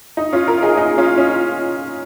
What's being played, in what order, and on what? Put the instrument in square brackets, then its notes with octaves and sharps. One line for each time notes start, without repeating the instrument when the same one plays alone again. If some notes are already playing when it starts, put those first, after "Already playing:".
[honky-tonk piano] D#4
C#4 F4
F4 A#4
D#4 G#4
D#4
C#4 F4
C#4